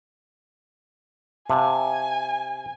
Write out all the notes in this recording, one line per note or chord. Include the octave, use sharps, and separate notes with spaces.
C3 F5 G#5 A5